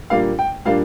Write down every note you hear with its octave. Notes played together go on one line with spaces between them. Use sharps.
A#2 G3 A#3 D4 F5
G5
A#2 G3 A#3 D4 F5